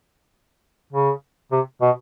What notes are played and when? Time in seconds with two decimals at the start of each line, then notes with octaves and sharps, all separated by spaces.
0.93 C#3
1.51 C3
1.81 B2